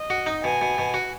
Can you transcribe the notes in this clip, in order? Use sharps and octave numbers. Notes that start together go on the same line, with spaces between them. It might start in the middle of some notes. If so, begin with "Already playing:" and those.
Already playing: D#5
F#4
D#4
B2 G#5
B2
B2
F#4